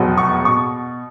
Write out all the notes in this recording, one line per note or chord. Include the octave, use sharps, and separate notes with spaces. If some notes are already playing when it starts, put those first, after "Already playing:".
Already playing: F1 E2 B2 F#3
C#6
B2 C#6